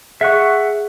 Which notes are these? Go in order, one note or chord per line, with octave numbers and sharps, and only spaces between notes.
G#4 E5 F#5 C#6